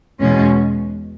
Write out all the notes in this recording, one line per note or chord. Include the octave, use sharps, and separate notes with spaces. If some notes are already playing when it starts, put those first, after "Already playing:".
E2 B2 G#3 C#4